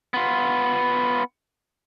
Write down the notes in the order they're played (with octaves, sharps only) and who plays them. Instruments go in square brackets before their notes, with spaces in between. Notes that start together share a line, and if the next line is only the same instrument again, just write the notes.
[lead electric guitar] B3 F4